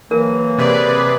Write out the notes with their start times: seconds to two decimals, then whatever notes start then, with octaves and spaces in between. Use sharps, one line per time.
0.11 E3 F#3 A#3 A#4
0.58 C3 G#4 B4 D5